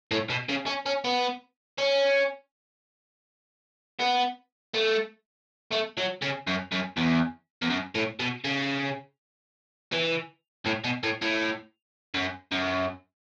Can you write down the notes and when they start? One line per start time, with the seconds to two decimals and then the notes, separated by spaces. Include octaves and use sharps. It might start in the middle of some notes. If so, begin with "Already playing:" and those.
0.11 A2
0.30 B2
0.49 C#3
0.67 C#4
0.86 C#4
1.04 B3
1.78 C#4
4.00 B3
4.74 A3
5.72 A3
5.98 F#3
6.22 C#3
6.47 F#2
6.72 F#2
6.97 E2
7.62 E2
7.70 F#2
7.95 A2
8.20 B2
8.45 C#3
9.92 E3
10.66 A2
10.84 B2
11.03 A2
11.22 A2
12.14 F#2
12.52 F#2